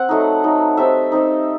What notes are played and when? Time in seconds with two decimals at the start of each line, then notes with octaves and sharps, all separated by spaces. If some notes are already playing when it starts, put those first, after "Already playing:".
Already playing: C4 F#5
0.09 F#3 A3 D#4
0.44 F#3 A3 D#4
0.77 G3 C4 D#4 E5
1.12 G3 C4 D#4